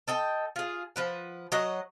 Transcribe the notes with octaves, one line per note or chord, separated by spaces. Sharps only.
A4 D#5 G5
F4 G#4
F3 B4 F#5
F#3 C#5 D#5 F#5